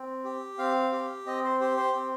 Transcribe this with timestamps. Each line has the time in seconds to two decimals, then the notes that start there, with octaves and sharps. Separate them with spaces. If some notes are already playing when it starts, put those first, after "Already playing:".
Already playing: C4
0.24 G4
0.58 C4 F5
0.92 G4
1.26 C4 D#5
1.44 C5
1.60 G4 C5
1.77 C5
1.95 C4